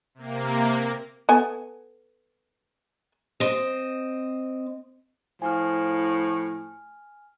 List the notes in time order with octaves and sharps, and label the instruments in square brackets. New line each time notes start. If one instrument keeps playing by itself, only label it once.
[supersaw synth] C3 A#3
[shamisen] B3 A4 G#5
[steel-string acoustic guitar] C4 D#5
[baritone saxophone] A2 [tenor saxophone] F3 [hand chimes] G#5 F6